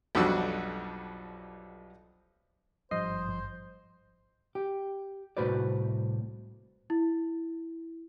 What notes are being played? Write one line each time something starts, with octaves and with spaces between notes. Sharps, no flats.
B1 F2 G3 D4 F#4 E6
G#1 G2 F3 C5 D#5 C7
G4
C2 A2 F#4 B4 C5 D5
E4